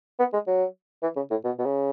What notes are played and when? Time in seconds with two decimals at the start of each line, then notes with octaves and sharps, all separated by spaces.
0.20 B3
0.33 G#3
0.47 F#3
1.03 E3
1.16 C#3
1.31 A2
1.45 B2
1.59 B2
1.66 C#3